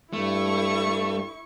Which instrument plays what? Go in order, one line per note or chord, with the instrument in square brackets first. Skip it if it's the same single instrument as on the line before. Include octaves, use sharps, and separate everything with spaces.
[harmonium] G2 [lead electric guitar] A3 [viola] E4 C#6